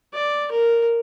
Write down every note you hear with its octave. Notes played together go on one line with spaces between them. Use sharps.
D5
A#4